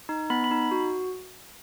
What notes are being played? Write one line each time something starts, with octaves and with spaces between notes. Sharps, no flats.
D#4
B3 B5
B5
D#4
F#4